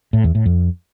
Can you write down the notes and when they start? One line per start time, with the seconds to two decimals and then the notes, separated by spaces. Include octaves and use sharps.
0.13 A2
0.24 E2
0.35 A2
0.46 F2